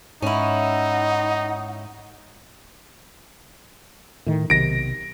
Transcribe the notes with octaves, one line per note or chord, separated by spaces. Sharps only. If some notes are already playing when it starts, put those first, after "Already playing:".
G#2 C#4 D#4 E4 F#5
A2 D#3
B1 C3 D#3 A#6 D7